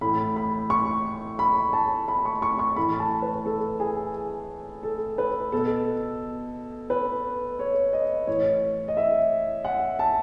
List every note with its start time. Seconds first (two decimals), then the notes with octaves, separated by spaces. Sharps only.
0.01 A2 E3 B5
0.36 B5
0.70 C#6
1.39 B5
1.73 A5
2.08 B5
2.25 C#6
2.42 C#6
2.59 C#6
2.76 A2 E3 B5
2.99 A5
3.22 B4
3.46 A4
3.80 G#4
4.83 A4
5.18 B4
5.52 B2 A4
6.90 B4
7.59 C#5
7.93 D#5
8.27 A2 E3 C#5
8.88 D#5
8.97 E5
9.65 F#5
9.99 A5